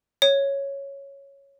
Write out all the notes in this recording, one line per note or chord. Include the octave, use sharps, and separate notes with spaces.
C#5